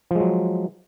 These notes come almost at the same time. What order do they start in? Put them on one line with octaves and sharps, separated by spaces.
F3 G#3 F#3